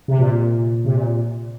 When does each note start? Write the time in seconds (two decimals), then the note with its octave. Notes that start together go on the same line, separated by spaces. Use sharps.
0.08 C3
0.19 A#2
0.85 C3
0.93 A#2